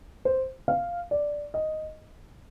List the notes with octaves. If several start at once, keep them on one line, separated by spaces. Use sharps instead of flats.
C5
F5
D5
D#5